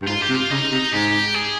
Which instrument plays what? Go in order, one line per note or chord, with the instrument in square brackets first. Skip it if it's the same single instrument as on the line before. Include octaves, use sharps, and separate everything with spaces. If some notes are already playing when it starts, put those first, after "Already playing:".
[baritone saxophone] G2
[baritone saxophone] G#2 [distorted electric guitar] F4
[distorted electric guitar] G4
[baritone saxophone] C3
[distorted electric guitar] F4
[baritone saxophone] C#3 [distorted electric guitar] D#4
[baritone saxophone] C3
[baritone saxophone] G#2 [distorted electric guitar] G4
[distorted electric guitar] G#4